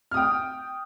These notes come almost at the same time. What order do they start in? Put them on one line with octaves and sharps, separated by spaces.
F6 D#6 G5